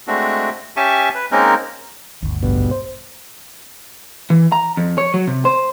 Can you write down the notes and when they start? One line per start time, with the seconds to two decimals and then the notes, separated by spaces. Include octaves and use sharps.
0.07 G#3 A3 C4 D4 F#4
0.76 C#4 G4 E5 G#5 A5 C#6
1.15 B4
1.32 G#3 A#3 C4 C#4 D#4 A#4
2.22 G1 D2
2.43 A1 G2 B2
2.71 C5
4.30 E3
4.52 A#5
4.77 F2
4.98 C#5
5.14 F#3
5.27 C3
5.45 C5